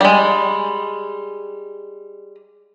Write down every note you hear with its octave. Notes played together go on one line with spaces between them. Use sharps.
G3 G#3